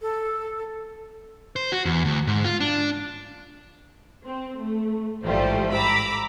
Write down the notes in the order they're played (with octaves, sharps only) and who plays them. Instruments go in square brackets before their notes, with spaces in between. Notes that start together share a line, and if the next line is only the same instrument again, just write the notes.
[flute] A4
[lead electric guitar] C5
F#4
E2
D2
G#2
F4
D4
[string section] C4
A3
A1 G#2 F3 G3 A3 C5
A#5 B5 D6 E6